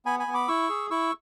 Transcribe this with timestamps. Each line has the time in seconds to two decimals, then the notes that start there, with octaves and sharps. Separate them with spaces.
0.06 B3 G#5 B5
0.19 G#5 B5
0.27 B3
0.34 B5 D6
0.48 E4 C#6 E6
0.69 G#4
0.90 E4 C#6 E6